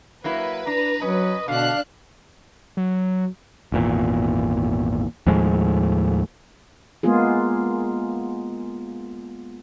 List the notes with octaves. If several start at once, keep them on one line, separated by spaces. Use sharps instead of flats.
F#3 A#3 E4 B4
D4 A#5
F#3 C#4 D#5
B2 D3 D4 F5 F#6
F#3
G#1 E2 A#2
D#2 A2 F3 G#3
G#3 A#3 B3 F4 G#4